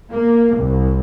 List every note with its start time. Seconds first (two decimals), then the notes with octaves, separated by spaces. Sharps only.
0.11 A#3
0.55 C2